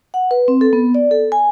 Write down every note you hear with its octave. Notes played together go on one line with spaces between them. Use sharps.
F#5
B4
C4
A4
B3
D5
A4
G#5